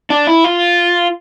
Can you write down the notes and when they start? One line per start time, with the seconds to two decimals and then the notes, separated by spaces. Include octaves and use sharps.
0.10 D4
0.27 E4
0.44 F4